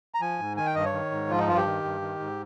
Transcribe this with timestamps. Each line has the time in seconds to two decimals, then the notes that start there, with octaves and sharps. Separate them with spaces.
0.14 A#5
0.21 F3 G#5
0.39 G#2
0.57 D#3 G#5
0.66 G5
0.75 G2 D#5
0.85 C#5
0.93 D#3
1.11 G#2
1.29 F3 F4
1.39 D#4
1.48 G2 F4
1.57 G4
1.65 D#3
1.84 G2
2.02 D#3
2.20 G#2